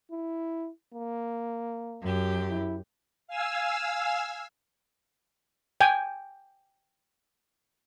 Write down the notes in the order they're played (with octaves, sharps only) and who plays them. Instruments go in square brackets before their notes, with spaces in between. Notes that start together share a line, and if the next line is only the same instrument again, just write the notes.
[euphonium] E4
A#3
[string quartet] F#2 G4
[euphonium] E4
[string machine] F5 G#5 E6
[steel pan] G5 G#5